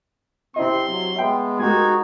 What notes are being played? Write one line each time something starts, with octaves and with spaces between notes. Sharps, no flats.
C3 C4 E4 D#5 C6
F#3
G#3 B3 E5 G5
G#3 D#4 F#4 G4 A#4 G#6